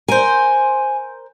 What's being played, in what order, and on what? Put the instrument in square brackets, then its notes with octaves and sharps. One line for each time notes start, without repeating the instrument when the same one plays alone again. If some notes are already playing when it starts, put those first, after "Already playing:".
[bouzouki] A#4 C5 [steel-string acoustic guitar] G#5